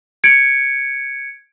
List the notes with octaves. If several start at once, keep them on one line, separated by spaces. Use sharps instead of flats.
G#6 C#7 D7